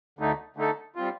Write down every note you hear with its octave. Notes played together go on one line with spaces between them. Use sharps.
D2 D3 A3 D#4
D3 A3 D#4 A4
G3 C4 F4